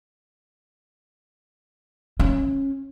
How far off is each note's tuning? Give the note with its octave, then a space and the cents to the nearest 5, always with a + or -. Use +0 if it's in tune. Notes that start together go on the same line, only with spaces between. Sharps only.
C#4 -20